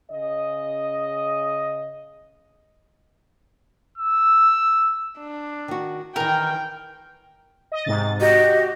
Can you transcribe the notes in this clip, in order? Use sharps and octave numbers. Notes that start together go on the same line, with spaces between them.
C#3 D#5
E6
D4
D#3 F#4
D#3 E3 A#4 G5
D#5
G#2 C3 A6
F#4 G4 D#5